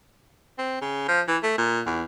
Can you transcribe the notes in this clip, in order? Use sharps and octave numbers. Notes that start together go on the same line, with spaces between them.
C4
C#3
F3
E3
A3
A#2
E2